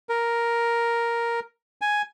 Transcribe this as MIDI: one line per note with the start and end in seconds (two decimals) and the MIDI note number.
0.09 1.40 70
1.81 2.02 80